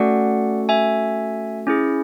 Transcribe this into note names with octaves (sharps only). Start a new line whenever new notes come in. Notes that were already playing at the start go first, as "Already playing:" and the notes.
Already playing: A3 C#4 F#4 A4 D5 F#5
E5 G#5
C#4 E4 G#4